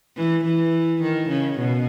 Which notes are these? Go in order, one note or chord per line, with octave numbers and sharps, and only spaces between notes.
E3
E3
D#3
C#3
B2